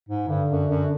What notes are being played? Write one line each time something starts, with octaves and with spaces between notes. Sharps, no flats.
G#2
G2 D3
F#2
F#2